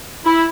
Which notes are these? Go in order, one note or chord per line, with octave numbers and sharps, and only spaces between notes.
E4